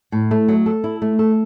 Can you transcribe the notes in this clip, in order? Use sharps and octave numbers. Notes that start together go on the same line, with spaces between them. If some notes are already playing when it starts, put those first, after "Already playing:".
A2
A3
F#3
A4
E4
A3
A4